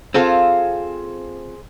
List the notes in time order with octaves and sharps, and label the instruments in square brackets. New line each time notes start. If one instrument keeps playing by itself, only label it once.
[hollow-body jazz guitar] C4 F4 A4 [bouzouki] G#4 C5 F5